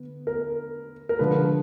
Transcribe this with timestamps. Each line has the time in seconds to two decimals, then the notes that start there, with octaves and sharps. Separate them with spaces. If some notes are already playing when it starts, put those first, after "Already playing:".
Already playing: D3 B3
0.27 A#4
1.09 A#4
1.19 D3 F3 G#3 B4